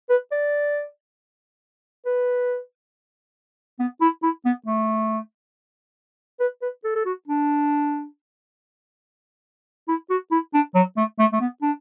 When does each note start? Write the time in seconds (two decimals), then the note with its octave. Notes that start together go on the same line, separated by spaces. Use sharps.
0.10 B4
0.32 D5
2.06 B4
3.80 B3
4.01 E4
4.23 E4
4.45 B3
4.66 A3
6.40 B4
6.62 B4
6.84 A4
6.96 A4
7.06 F#4
7.28 D4
9.88 E4
10.10 F#4
10.32 E4
10.54 D4
10.75 F#3
10.97 A3
11.19 A3
11.33 A3
11.41 B3
11.62 D4